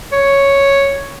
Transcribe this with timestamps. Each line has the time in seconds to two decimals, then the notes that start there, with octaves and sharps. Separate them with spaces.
0.12 C#5